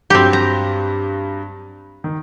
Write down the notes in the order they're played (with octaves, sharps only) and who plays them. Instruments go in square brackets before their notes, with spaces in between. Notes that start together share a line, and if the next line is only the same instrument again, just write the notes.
[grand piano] G2 F#3 [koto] C4 G4
[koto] A#5
[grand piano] D#3